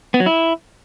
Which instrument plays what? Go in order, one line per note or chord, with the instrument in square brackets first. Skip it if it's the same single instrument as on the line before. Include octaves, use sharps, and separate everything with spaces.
[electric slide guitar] B3
F#3
E4